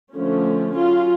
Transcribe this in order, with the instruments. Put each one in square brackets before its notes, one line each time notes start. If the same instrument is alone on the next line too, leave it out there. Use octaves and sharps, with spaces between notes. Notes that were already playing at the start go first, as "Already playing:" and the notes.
[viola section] D3 F3 A3 C#4
F#3 C#4 F4